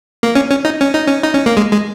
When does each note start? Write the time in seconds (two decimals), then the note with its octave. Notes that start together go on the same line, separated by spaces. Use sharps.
0.23 A#3
0.35 C#4
0.50 C#4
0.65 D#4
0.81 C#4
0.94 D#4
1.07 C#4
1.23 D#4
1.34 C#4
1.46 A#3
1.57 G#3
1.72 G#3